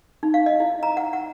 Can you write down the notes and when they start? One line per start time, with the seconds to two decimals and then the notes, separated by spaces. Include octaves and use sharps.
0.23 D#4
0.34 F5
0.46 D#5
0.60 E4
0.83 A#5
0.97 F#5
1.13 F#5